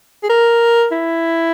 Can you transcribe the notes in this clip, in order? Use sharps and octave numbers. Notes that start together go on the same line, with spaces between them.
G#4
A#4
E4